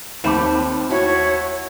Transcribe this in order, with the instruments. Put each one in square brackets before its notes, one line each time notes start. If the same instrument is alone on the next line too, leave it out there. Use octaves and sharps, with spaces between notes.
[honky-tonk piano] D#2 B5 D6 [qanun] A3 C5 [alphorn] C4
[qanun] E4 [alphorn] F#4 [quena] C#5